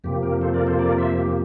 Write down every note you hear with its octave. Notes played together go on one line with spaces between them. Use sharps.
F2 C3 F3 A#3 G4
G4 A#4
A4 C5
A#4 D5
A4 C5
A#4 D5
C5 E5
G4